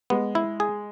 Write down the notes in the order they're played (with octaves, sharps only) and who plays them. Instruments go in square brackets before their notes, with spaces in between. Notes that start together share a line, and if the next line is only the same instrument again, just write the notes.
[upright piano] G#3 [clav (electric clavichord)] B3
[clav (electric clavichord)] E4
G#4